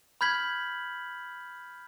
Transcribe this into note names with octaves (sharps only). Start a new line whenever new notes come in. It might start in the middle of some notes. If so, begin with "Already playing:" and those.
B5 F6 G6 G#6 B6 F#7